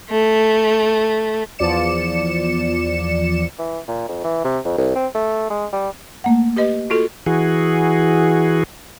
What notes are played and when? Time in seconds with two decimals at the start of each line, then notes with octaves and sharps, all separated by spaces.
0.10 A3
1.59 E2 F3 D5 C#7 E7
3.59 E3
3.88 A#2
4.08 F2
4.24 E3
4.44 C3
4.65 F2
4.78 C2
4.95 C4
5.15 A3
5.50 G#3
5.73 G3
6.24 A3 A#3 F#5
6.56 G4 B4 D#5
6.90 F4 F#4 A4
7.26 E3 F#4 G#4